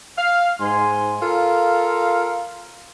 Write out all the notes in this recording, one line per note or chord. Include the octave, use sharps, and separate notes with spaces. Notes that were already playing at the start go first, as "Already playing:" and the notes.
F5
G#2 G#5 C6
F4 A4 A#4 F5